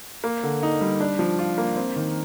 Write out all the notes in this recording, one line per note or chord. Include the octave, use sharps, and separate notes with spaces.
A#3
D3
D#4
G3
D4
F3
F4
A#3
C4
D#3